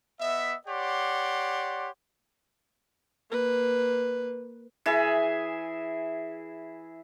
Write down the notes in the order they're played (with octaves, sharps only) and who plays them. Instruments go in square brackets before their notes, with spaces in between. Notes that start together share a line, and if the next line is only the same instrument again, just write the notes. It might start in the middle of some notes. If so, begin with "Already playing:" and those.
[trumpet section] B3 D#5 E5
G4 C#5 D5 F#5 C6
[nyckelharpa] A#3 B4
[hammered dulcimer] E3 G#4 E5